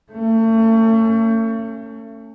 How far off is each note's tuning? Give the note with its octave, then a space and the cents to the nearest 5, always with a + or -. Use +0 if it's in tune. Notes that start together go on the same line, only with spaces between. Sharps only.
A3 +35 C#4 +0